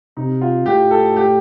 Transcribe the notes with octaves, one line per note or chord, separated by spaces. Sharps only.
C3 D#4
F4
A2 G4
A4
G4